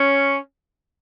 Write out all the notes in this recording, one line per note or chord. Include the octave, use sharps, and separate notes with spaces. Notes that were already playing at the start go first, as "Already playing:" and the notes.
Already playing: C#4